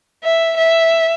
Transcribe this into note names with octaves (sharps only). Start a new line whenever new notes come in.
E5
E5